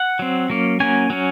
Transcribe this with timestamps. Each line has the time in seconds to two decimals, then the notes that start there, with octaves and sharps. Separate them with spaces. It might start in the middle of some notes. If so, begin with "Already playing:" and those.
Already playing: F#5
0.19 F#3 C4
0.50 F#3 A#3 C#4
0.80 F#3 A#3 C#4 G#5
1.10 F#3 C#4